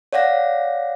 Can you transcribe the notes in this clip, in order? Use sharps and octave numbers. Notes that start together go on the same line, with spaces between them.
C#5 D5 F5 F#5 A#6